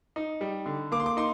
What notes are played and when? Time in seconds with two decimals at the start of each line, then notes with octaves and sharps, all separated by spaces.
0.16 D#4
0.41 G3
0.66 D3
0.92 A#3 D6
1.00 C6
1.06 D6
1.17 D#4 C6